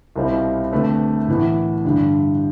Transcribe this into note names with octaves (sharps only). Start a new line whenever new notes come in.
C2 B2 G3 C4 F4
D3 A3 C4 G4 B4
A2 E3 B3 E4
G2 D3 G3 D4